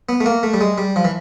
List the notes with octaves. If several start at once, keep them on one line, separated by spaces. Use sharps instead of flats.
B3
A3
A#3
A3
G3
G#3
G3
F3
E3